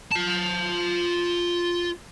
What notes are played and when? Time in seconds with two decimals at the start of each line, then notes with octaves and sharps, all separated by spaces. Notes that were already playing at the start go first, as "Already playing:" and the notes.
0.12 F4 A5